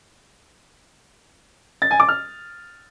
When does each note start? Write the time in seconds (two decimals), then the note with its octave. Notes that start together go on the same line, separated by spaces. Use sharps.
1.82 A6
1.91 G#5
2.00 D6
2.09 F6